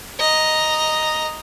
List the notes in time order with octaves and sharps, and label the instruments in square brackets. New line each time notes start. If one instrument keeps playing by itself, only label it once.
[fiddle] D#5 A#5